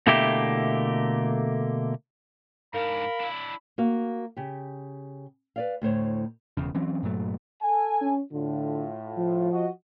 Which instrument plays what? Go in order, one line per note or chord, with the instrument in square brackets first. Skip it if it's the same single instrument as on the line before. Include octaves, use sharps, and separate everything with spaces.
[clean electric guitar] B2 D3 A3 A#3 E4 G4
[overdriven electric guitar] G#2 D4 [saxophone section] A#4 [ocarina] F5 [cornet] B5
[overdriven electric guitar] D4 E4
[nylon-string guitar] A#3 F#4 F5
C#3 G4
B4 D5 F5
D2 A2 C5 C#5
[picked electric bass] E1 E2 C#3
E3 F#3 C4 C#4
G2 A#2 F#3 A3
[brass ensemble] A4 G#5
[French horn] C#4
[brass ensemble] A2 F4 [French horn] D3
[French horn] F3
[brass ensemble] F#4 D#5